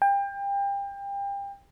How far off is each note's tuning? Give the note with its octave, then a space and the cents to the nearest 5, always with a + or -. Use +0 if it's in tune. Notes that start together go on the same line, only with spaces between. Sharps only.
G5 +30